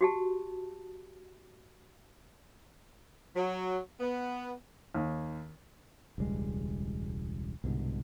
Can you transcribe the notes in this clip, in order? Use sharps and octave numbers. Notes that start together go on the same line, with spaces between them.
F#4 G4 A5
F#3
B3
D#2
E1 C#2 G3 G#3
C2 G#2 B2 D3